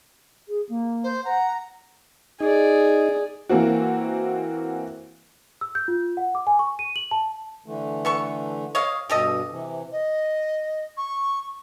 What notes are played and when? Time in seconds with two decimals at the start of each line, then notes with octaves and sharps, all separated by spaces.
0.48 G#4
0.69 A#3
1.03 C5
1.25 F#5 A#5
2.40 D#4 G#4 D5
3.49 E3 A#3 C4 F#4
5.61 E6
5.75 G6
5.88 F4
6.17 F#5
6.35 D6
6.47 G#5
6.59 C#6
6.79 D#7
6.96 F#7
7.11 A5
7.66 D3 E3 A3
8.05 B3 A4 C#6
8.75 C#5 D#5 F5
9.09 G2 B2 G4 A4 D#5
9.50 C3 E3
9.92 D#5
10.97 C#6